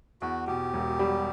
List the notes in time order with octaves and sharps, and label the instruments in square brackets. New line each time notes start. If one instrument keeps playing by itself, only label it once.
[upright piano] E2 [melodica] F#4
[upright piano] B2 [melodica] G4
[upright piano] E1
G3